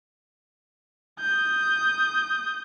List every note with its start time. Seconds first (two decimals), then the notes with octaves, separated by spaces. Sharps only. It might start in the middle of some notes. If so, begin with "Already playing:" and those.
1.20 D#6 G6